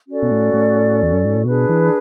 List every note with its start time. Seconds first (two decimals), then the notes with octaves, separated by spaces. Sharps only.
0.08 C#4 F#4 A4 D5
0.23 B2
0.31 A2
0.54 A2
1.03 E2
1.13 F#2
1.25 G#2
1.35 A2
1.45 B2 D4 G#4 B4
1.69 E3